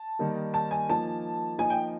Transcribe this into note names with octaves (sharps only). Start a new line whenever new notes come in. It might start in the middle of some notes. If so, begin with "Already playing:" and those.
Already playing: A5
D#3 G3 A#3 D#4
A5
G#5
F3 A#3 D#4 A5
F3 A#3 D#4 G#5
G5